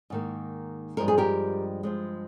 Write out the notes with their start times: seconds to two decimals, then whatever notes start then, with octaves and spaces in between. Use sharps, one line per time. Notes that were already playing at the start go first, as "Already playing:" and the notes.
0.10 G#2 D#3 A#3
0.97 G2 F3 G#3 A#4
1.08 G#4
1.18 G4 A#4
1.83 G2 F3 G#3